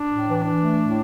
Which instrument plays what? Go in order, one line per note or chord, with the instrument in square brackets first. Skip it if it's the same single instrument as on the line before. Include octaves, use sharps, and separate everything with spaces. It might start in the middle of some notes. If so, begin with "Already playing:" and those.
Already playing: [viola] D4
[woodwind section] A2
E3
[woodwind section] E3 [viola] D4
[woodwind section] A3
A2